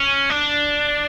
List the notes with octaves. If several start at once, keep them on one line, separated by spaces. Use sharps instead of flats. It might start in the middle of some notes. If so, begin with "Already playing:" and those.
Already playing: C#4
D4